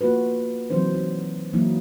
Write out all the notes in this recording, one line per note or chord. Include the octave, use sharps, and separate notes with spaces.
A#3 F4 F#4 B4
E3 F#3 C4 D#4 C5
D#4
E3 F#3 A#3 D#4 E4